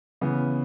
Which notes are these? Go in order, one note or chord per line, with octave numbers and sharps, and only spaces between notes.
C#3 E3 B3